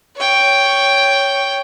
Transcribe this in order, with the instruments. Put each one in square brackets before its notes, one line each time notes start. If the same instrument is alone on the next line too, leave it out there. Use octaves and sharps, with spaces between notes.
[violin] C#5 G5